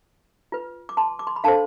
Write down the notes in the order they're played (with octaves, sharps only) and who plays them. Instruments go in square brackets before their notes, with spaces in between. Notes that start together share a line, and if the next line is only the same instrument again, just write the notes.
[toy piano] F4 B4
D6
A5 C6
D6
C6
B5
D4 A4 C5 F5 A5